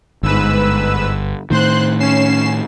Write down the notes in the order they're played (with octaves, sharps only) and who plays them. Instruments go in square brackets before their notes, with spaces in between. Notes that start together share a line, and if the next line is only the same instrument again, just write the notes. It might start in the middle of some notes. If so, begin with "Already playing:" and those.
[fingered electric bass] G1 [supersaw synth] G#2 B4 E6
[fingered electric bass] A2 D#3 [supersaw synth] C5 C6 F#6
[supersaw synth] C#4 C7 E7